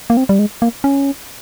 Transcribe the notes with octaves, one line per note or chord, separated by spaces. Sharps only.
A#3
C4
G3
G#3
A#3
C#4